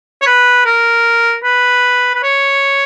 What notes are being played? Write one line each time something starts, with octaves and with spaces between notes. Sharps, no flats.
C#5
B4
A#4
B4
B4
C#5